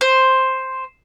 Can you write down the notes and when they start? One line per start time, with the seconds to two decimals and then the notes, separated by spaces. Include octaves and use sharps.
0.01 C5